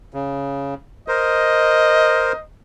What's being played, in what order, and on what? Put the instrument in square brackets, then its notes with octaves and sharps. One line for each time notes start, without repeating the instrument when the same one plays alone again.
[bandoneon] C#3
[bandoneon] A#4 C5 [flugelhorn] D#5